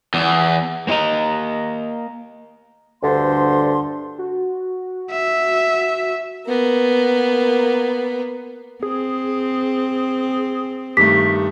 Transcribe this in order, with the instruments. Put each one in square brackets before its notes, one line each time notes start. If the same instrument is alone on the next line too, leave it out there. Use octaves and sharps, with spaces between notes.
[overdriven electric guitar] E2
[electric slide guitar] A#3 C4 F4 D#5 A#5
[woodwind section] D2 G2 D3 C5 C6
[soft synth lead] F#4
[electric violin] E5
[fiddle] A#3 B3
[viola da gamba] C4 [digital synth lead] G#4
[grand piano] G2 D#3 A3 [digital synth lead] G4 [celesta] B6